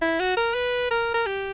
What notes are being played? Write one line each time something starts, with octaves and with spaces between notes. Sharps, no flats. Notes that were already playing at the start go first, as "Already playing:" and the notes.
E4
F#4
A#4
B4
A#4
A#4
G4